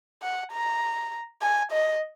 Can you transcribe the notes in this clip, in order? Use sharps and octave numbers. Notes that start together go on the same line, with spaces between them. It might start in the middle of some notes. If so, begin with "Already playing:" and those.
F#5
A#5
G#5
D#5